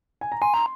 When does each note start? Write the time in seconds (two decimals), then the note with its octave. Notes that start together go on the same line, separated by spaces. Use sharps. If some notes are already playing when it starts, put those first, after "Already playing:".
0.21 G#5
0.32 A#5
0.42 G#5 C6
0.54 A#5